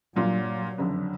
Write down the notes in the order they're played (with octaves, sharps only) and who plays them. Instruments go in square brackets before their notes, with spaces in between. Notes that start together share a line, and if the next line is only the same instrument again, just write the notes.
[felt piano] G2 A#2 F4 [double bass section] F#3
[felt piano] F#1 F2 D3